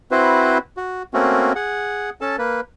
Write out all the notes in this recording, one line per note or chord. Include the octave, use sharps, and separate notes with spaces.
C4 E4 F#4 B4 C5
F#4
A3 A#3 C4 C#4 F#4
G#4 F#5
C#4 A4 A5
A#3 B4